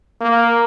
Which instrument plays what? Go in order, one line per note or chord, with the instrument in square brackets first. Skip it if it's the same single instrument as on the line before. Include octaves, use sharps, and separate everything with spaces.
[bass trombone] A#3